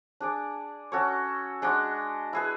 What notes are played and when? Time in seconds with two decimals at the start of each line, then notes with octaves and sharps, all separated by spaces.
0.20 D4 G#4 D5
0.92 C#4 F#4 A4 C#5
1.62 G#3 D4 F#4
2.33 E4 G#4 B4